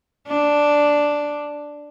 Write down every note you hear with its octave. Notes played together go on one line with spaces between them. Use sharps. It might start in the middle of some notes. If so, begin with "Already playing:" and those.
D4